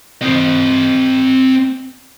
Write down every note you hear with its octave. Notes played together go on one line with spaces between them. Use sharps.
C4 D#5